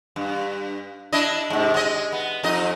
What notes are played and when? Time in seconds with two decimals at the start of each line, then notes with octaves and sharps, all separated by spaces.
0.16 G2
1.13 D4 E4 D#5
1.50 G#2 C3
1.74 G#3 D#5
2.12 B3
2.43 F2 D#4 D#5